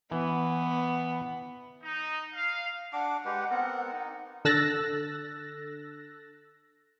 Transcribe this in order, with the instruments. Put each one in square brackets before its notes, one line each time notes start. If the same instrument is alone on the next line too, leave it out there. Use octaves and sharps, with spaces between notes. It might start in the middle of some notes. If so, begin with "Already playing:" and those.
[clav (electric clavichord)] E3 [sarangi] B3
[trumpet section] D#4
F5
[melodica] D4 D6 [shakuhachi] F#5
[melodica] G#3 G4 B4
B3 C4 A#4
D#4
[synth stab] D3 A4 E6 F#6 A6 A#6